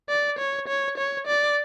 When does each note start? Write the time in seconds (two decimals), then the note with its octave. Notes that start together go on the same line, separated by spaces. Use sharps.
0.09 D5
0.39 C#5
0.68 C#5
0.97 C#5
1.27 D5